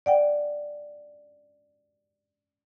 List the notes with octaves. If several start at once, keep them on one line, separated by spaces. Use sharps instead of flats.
D5 F#5 G5